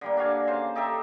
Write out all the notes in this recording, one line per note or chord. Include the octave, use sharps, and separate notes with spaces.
D3 G3 A#3
D4 F#4 F5 G#5
C#3 C5 F5
D#4 G4 A4 E5